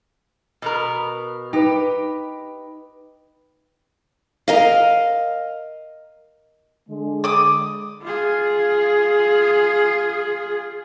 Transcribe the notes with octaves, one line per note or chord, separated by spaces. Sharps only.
B2 B3 A#4
D#4 G4 B4
A#4 D#5 F5
D3 G#3
D6 D#6
F4 G#4